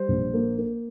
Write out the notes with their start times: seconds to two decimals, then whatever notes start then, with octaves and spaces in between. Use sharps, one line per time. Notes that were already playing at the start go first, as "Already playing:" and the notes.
Already playing: G3 C5
0.08 A#1
0.34 A#3
0.58 A#3